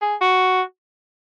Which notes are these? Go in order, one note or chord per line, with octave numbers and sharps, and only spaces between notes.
G#4
F#4